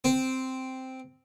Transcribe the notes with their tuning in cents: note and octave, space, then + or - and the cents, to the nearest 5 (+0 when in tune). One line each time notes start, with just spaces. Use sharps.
C4 -5